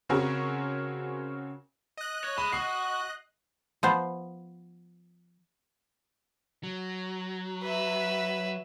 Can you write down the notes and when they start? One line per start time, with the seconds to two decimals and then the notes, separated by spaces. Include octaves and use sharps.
0.09 C#3 C4 C#4 F#4 G#4 A#4
1.97 D#5 F#6
2.24 C#5
2.38 G#3 B5
2.52 F#4 D#6 C7
3.83 F3 B3 C5
6.63 F#3
7.63 B4 E5